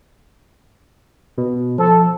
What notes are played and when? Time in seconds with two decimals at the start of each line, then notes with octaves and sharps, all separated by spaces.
1.38 B2
1.78 F3 A4